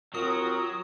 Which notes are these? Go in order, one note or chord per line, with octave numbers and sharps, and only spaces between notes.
D#2 F#3 C4 F4 A#4 D#6